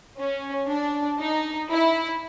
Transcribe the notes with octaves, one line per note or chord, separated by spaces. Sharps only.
C#4
D4
D#4
E4